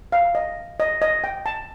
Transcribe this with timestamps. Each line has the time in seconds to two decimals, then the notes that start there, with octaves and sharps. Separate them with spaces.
0.12 F5
0.35 D#5
0.80 D#5
1.02 D#5
1.24 G5
1.46 A5